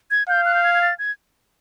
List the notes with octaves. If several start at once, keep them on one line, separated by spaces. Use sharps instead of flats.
G#6
F5 G6
F#6
G6
G#6
G#6
A6
G#6